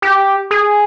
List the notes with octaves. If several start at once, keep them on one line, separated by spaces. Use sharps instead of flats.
G4
G#4